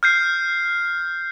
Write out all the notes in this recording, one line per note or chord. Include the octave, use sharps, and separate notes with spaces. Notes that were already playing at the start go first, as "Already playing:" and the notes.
F6 G6 C7